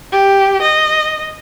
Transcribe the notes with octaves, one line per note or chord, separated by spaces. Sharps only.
G4
D#5